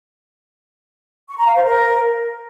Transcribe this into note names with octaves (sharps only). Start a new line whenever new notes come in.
C#6
A#5
F5
C5
A#4